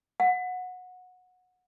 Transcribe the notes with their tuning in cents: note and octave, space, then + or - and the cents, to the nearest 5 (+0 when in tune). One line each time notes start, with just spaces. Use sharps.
F#5 -20